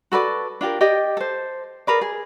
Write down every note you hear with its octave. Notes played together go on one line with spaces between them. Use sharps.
F#4 A4 B4 D5
D4 F4 G4 A#4
G4 D5 D#5 G5
A4 C5
G#4 A#4 B4 D5
G#4